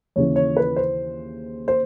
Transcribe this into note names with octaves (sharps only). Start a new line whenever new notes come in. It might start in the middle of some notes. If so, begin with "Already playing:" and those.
D#2 C#3 E3 C#5
C#5
B4
C5
C5